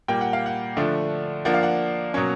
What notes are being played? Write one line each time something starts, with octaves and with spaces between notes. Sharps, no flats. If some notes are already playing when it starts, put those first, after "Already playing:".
A#2 G3 A#3 G5
F#5
F5
F#5
D3 F3 A3 D4
F3 A#3 D4 F#5
F5
F#5
B2 F#3 A#3 C#4